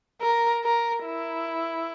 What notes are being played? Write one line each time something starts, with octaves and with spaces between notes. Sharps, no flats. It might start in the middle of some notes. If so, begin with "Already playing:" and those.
A#4
A#4
E4